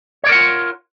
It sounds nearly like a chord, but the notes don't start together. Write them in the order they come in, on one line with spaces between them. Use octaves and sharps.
C#5 D5 A#4 F#5 F4